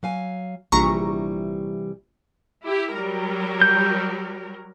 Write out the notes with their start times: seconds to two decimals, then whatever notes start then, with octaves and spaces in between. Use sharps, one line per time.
0.03 F#3 F5 G#5
0.72 A#1 C3 E3 G3 A#5 C#6
2.64 E4 G4
2.95 F#3 G3 A#4
3.62 G6